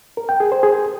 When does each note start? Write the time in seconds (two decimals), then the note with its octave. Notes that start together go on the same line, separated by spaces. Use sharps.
0.17 A#4
0.29 G5
0.40 G#4
0.52 C5
0.63 G#4